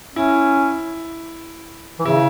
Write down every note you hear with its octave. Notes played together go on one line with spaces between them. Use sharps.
C#4 E4
E3
C#3 E4